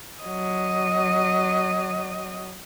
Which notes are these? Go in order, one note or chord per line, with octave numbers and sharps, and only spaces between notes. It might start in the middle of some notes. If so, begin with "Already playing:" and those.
F#3 D#5